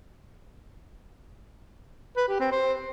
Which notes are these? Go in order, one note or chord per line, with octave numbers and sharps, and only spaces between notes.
B4
G4
C4
C5